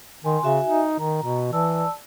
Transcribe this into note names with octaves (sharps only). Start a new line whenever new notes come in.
D#3 G#5 C6
C#3 F#4 E5 G#5
D#4
D#3 A#5
B2
E3 D5 A5 E6